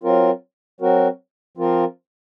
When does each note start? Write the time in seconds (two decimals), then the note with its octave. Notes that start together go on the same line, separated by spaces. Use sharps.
0.03 F#3 C4 F4 A#4
0.81 F#3 C4 F#4 A#4
1.57 F3 C4 F4 A#4